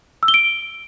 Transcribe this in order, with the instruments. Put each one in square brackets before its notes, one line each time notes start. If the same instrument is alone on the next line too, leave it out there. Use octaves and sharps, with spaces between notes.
[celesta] E6
G7
D7